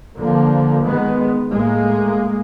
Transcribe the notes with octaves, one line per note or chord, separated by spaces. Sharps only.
D3 F3 A#3
D#3 G#3 B3
A2 G#3 A#3